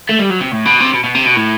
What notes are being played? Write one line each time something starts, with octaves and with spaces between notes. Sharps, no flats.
A3
G3
F#3
C3
A2
B2
C3
B2
B2
C3
B2
A2